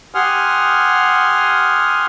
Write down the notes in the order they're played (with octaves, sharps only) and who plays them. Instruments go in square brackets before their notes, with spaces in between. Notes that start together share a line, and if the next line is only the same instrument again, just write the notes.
[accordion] G4 F#5 G#5 C6 D#6 F6